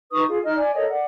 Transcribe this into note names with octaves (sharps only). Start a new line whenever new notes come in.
D#4 B4 C#6 D#6
F4 G#4
D#4 D#5 F6
D5 G#5
A4 A#4 C#5 D#5
D5 F#5